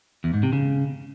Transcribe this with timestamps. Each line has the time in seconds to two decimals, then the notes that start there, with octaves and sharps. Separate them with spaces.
0.24 E2
0.34 G#2
0.43 C3
0.53 C#3